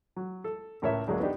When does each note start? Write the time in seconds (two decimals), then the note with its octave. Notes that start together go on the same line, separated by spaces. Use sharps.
0.16 F#3
0.44 A4
0.82 C#2 A2 A#4 C#5 E5
1.07 D2 D3 F#3 G#3 A#3 D4
1.20 B3 D4 D#4 G4